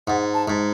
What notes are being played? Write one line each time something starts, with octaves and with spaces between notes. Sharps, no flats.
G#2 F#5
A5
G#2